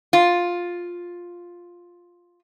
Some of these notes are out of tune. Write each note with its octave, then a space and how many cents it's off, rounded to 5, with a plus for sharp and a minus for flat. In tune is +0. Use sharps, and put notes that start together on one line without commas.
F4 +5